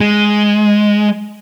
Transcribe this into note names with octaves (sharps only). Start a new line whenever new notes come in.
G#3